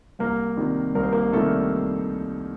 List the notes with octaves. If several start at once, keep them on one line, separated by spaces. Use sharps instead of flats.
C2 A#3 A#4
C3 D#3 G3
C2 A#4
C5
A#3 A#4
C3 D#3 G3 A3 A4